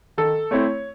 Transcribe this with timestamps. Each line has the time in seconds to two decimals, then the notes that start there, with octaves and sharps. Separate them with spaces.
0.18 D#3 A4
0.51 A3 C4 E4 C#5